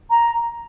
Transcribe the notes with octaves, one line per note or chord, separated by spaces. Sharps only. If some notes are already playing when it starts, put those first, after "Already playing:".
A#5